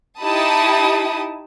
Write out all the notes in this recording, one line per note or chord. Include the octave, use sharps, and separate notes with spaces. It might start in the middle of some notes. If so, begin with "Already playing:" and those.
D#4 E4 G4 A5 B5 D#6